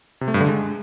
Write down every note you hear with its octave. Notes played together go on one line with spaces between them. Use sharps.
C3
A3
G2
D3
G#3